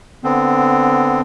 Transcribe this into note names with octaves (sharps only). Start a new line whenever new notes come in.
D3 B3 C4